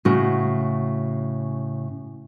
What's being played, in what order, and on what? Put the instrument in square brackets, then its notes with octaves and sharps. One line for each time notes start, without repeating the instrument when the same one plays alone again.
[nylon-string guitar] A2 C#3 F#4